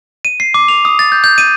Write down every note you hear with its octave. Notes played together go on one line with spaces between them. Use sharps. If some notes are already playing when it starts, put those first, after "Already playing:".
D#7
C7
D6
F7
D#6
A6
G6
G6
D#7